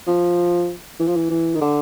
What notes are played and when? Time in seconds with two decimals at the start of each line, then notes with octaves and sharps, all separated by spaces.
0.07 F3
1.00 E3
1.07 F3
1.16 E3
1.30 E3
1.55 D#3
1.61 D3